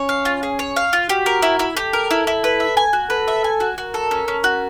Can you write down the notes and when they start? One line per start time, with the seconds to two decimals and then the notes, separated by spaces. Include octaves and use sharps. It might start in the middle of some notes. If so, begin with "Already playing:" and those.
Already playing: C#4 C#5
0.09 F5
0.25 F4
0.43 G#4
0.59 C#5
0.76 F5
0.93 F4
1.09 F#4 G4
1.26 A#4
1.42 E4
1.59 E4
1.77 G4 A4
1.93 A#4
2.11 E4
2.27 E4
2.44 B4
2.60 E5
2.77 G#5
2.93 F#4
3.10 A4 B4
3.28 E5
3.44 G#5
3.60 F#4
3.77 F#4 A#4
3.94 A4
4.11 C#4
4.28 C#4
4.44 F#4